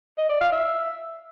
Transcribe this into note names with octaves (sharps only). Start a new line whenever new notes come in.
D#5
D5
F5
E5